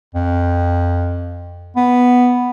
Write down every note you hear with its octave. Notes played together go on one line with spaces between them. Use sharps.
F2
B3